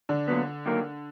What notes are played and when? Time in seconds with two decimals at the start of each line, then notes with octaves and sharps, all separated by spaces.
0.09 D3 D4
0.28 A#2 F#3 B3
0.66 D#2 D#3 F#3 A#3